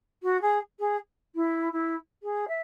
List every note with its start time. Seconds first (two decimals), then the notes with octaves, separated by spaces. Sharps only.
0.23 F#4
0.41 G#4
0.79 G#4
1.35 E4
1.72 E4
2.23 G#4
2.48 E5